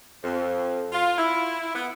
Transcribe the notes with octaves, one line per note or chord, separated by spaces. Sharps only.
F2
F4
E4
B3